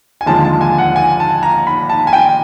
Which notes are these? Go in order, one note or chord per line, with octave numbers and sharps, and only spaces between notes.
G#5
D#2 D3 F3 G#3 A5
A5
G#5
F#5
G#5
A5
A#5
B5
A5
G#5
G5